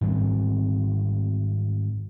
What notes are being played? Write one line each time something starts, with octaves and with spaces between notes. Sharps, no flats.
G#2 D#3 G3 C4